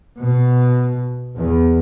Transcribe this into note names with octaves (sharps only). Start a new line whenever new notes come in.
B2
E2